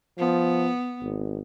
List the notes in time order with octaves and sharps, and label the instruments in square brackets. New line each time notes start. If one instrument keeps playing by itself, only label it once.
[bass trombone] F3 [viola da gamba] B3
[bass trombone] G#1